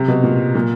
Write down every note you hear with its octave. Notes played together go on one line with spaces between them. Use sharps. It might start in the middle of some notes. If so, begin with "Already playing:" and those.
Already playing: C3
B2
A#2
A#2